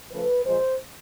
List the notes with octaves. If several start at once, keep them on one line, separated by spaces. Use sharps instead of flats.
C#3 F3 A3 B4
A#2 F3 G#3 C5